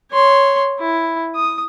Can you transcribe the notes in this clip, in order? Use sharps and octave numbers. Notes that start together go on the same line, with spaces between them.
C#5 C6
E4
D#6